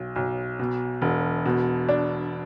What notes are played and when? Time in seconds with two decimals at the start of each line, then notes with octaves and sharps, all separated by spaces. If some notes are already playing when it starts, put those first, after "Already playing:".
Already playing: B1
0.16 B1
0.59 B2
1.02 E1
1.46 B2
1.89 D4